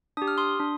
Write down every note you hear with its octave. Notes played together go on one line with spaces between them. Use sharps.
D4 G4 D#6
F6
C6 D#6
D4